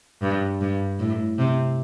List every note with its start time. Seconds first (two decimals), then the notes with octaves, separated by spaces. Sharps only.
0.22 G2
0.61 G2
0.99 A2
1.38 C3